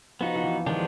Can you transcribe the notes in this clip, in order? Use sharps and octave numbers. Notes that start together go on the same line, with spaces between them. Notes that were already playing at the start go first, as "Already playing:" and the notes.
F3 B3 D#4 F#4
F3
E3
D#3 F3 G#3 B3 D4 G4